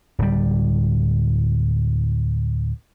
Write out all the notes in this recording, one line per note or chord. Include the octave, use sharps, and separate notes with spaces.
D1 G3